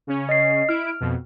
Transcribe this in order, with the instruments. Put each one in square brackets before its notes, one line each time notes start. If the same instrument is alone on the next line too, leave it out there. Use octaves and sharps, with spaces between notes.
[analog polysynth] C#3 C#4
[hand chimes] D#5 C7
[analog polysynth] E4 D7 [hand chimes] F6
[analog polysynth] F2 B2